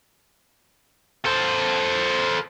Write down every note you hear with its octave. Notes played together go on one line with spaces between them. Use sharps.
A4 C5